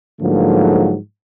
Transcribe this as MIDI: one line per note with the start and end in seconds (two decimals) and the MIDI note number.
0.21 0.94 44
0.21 0.94 50
0.21 0.94 53
0.21 0.94 54
0.21 0.94 57
0.21 0.94 58